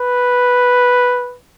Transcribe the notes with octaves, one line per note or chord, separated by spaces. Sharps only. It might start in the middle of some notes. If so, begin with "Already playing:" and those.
Already playing: B4